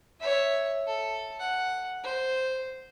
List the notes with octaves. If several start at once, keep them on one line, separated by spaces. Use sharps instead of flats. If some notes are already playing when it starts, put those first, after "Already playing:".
C#5 E5
A4
F#5
C5